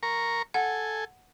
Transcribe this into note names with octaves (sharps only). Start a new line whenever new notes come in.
A#4 A#5 C#6
A4 F#5 G#5